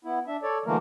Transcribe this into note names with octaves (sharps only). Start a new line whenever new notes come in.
B3 E4
D4 E5
A4 C#5 D5
D3 E3 F#3 A3 A#3 A#4